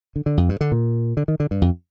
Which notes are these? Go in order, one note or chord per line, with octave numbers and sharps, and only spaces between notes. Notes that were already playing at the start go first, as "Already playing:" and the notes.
D3
D3
F2
G2
D3
A#2
D3
D#3
D3
G2
F2